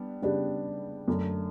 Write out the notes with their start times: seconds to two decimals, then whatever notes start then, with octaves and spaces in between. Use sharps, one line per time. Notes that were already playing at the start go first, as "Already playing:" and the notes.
Already playing: G3 B3 D4
0.22 C#3 G3 B3 D4 G4
1.08 F#2 D3 A3 D4